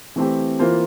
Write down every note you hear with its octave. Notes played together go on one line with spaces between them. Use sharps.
E3 A3 C4 G4
E3 A#3 F4 C5